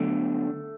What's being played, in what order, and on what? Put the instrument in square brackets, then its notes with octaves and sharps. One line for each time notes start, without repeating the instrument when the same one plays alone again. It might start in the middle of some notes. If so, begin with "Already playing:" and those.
Already playing: [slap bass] D3 F#3 B3 D4 [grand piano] A3